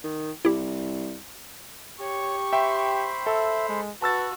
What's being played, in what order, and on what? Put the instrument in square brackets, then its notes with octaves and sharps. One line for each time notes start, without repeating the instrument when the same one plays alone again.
[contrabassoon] D#3
[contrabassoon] C2 [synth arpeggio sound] E4 G4
[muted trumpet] G4 [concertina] C#5 [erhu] C#6
[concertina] C5 B5 [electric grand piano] E5 G5
[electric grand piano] A4 [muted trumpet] E5
[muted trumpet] G#3
[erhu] F#4 [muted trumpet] B4 [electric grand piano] A5 E6 A6